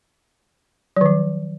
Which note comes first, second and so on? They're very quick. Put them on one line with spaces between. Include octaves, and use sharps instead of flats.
F#3 D#3 F3